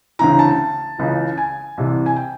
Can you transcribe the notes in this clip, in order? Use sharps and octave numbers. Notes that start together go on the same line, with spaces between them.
D2 C#3 E3 A#5
A5
C#2 C#3 E3
G#5
C2 C3 E3
G#5
G5